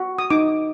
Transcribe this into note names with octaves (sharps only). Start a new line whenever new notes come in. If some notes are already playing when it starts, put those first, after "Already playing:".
Already playing: F#4
D#6
D#4 D6